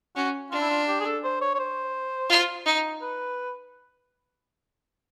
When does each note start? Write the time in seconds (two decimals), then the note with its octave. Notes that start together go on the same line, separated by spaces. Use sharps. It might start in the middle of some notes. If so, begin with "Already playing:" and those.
0.16 C#4 F#4
0.51 D4 F4
0.61 E4
0.70 F4
0.87 G4
1.01 G#4
1.06 A4
1.24 C5
1.41 C#5
1.55 C#5
1.59 C5
2.29 F4
2.66 D#4
3.01 B4